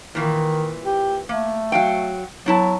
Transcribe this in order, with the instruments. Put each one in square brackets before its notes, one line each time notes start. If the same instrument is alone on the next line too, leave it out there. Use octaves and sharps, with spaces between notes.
[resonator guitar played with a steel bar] A#2 E3 [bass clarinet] D#3
[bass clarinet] G4
[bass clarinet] A3 [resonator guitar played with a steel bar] A#3
[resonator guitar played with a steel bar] F#3 F5 G5
[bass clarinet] F#3 [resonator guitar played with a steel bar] B3 E4 A5